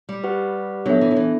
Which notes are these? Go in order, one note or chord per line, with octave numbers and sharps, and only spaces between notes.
G3
G4 B4 F#5
F#3 B3 D4 A4 E5
E3
F#3
E3